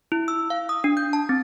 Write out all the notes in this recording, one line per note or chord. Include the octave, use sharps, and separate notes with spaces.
E4
E6
F5
D#6
D4
G6
A5
C4